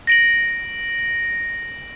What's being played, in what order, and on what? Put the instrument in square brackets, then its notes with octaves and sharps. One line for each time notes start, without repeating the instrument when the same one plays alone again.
[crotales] A#6 D7 F#7